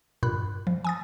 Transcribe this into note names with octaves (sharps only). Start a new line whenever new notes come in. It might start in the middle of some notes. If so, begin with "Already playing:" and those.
G2 A#2 B5 F#6
F3
G#5 D#6 A6